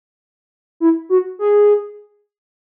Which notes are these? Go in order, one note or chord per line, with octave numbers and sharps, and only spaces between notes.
E4
F#4
G#4